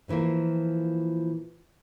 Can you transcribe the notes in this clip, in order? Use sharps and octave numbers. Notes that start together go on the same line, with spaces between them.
A#2 D3 E3 F3 A#3